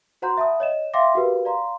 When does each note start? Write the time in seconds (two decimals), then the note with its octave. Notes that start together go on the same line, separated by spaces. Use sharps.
0.22 F#4 C5 F#5 A#5 C6 G6
0.37 E5 F#5 A5 B5 D#6
0.60 C#5 D#5 E7
0.93 E5 F5 G5 C6 D6 A#6
1.15 F#4 G4 A#4 B4 F5
1.45 D5 F5 A#5 C6